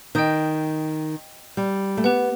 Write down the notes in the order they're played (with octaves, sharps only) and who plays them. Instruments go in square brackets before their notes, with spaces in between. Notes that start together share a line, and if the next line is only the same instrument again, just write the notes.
[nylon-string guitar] D#3 [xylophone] D#5 G5 D#6 G6
[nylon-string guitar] G3
A3
[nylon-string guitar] B3 [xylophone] G4 B4 F#5